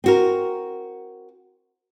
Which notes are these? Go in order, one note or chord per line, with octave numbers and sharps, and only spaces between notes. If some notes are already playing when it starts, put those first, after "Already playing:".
C4 F#4 A#4